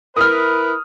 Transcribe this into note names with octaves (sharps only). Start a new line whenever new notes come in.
E4 A#4 B4 D#6 F6